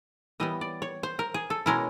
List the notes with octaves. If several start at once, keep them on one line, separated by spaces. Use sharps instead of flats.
E3 G3 B3 D#5
D5
C#5
C5
A#4
G#4
A4
B2 G#3 C#4 E4 A#4